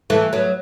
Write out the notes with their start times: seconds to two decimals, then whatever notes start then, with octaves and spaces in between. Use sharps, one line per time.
0.10 E3 A3
0.33 F#3 B3